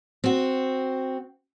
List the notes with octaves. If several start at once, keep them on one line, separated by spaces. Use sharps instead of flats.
C4 F#4